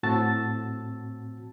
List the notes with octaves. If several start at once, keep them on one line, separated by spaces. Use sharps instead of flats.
A2 C4 F#4 A5 E6 A6